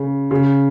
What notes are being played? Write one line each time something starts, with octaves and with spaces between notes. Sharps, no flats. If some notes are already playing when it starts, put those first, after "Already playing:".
Already playing: C#3
C#3